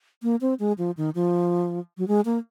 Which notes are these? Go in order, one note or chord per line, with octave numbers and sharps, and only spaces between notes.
A#3
C4
G#3
F3
D#3
F3
F#3
G#3
A#3